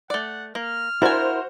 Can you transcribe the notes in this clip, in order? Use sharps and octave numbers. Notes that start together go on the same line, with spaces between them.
A3 D5 F#5
A#3 F6
D4 E4 F#4 A#4 C5 F5 G#5